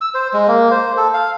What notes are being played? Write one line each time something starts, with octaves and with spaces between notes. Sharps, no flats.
E6
C5
G#3
A#3
C5
A4
F5